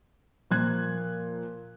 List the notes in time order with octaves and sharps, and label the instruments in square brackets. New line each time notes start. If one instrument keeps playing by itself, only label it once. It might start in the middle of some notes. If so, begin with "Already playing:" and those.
[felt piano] A#2 F3 A#3 F#6 G#6